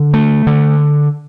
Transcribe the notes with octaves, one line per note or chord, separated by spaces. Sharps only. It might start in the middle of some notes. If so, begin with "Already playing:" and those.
Already playing: D3
A3
D3